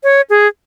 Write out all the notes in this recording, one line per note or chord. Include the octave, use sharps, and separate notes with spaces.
C#5
G#4